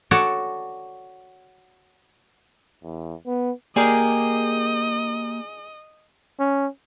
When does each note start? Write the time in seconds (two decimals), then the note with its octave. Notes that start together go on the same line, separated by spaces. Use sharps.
0.11 F#4 A4 C#5 D5
2.83 E2
3.26 B3
3.76 A#3 G4 G#4 A#4 D5 D#5
6.40 C#4